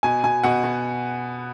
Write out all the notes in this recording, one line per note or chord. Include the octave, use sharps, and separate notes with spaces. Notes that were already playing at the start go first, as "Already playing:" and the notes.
B2 G#5
B2 G#5
B2 F#5
B2